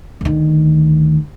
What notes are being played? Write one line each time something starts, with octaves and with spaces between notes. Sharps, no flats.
D2 D#3